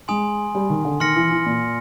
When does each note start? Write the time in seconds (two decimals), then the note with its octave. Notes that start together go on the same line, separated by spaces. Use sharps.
0.08 G#3 G#5 C6 D#6
0.55 G3
0.70 D#3
0.85 D3
1.00 D#3 C6 F6 A#6 C#7
1.16 E3
1.31 E3
1.46 A#2